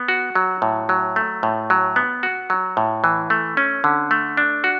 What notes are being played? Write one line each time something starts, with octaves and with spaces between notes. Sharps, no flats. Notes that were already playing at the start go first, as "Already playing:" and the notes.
Already playing: B3
F#4
F#3
A2
F#3
A3
A2
F#3
B3
F#4
F#3
A2
E3
A3
C#4
D3
A3
D4
F#4